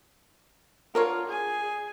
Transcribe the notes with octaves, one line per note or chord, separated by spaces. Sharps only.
D3 A#3 F4 A#4 C#5
G#4 G#5